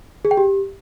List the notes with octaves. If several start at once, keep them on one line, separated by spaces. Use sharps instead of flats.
G#4
G5
G4